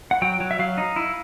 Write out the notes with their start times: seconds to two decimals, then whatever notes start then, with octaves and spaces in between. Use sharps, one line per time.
0.11 F#5
0.22 F#3 G5
0.40 F#3
0.51 E5
0.59 F#3 F5
0.78 D#4
0.96 E4